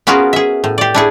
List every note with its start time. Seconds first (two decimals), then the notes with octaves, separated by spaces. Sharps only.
0.07 B3 C#4 F4 F#4 G#4 A#4
0.33 G#4 E5
0.64 A2
0.78 G4 D5
0.94 D4 E4 G#4